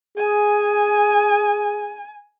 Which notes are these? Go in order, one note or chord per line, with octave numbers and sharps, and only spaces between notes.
G#4 G#5